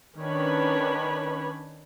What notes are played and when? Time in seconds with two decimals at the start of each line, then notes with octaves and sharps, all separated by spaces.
0.19 D#3 C#4 D4 B4 C#5 B5